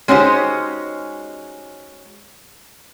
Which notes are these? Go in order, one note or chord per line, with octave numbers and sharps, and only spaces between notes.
G#3 C#4 D#4 F#4 G4 C5